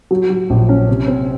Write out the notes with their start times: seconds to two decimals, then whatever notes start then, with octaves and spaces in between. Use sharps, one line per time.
0.11 F#3
0.30 F#3
0.50 A#1
0.69 C#4
0.89 C3
1.08 C4